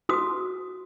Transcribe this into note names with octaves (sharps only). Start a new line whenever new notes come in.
F#4 D#6